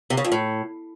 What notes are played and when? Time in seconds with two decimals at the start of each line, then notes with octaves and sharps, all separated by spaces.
0.10 C3
0.17 C#3
0.25 F2
0.32 A2